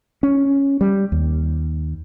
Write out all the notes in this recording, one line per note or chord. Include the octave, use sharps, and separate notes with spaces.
C#4
G3
D#2